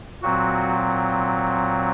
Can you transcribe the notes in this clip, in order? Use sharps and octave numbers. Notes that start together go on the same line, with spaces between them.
A#2 F#3 C4 F#4